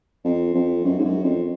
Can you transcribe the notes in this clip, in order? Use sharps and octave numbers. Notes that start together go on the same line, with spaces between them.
F2
F2
F#2
G#2
F#2
F2